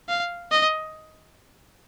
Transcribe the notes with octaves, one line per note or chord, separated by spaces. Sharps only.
F5
D#5